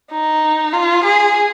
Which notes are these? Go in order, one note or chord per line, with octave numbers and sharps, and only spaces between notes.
D#4
F4
G#4